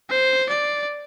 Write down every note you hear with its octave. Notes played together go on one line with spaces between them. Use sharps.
C5
D5